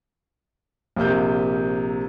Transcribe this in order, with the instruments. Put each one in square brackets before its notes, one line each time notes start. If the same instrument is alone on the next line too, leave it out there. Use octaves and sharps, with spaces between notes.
[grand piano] A#1 C3 A#3 G6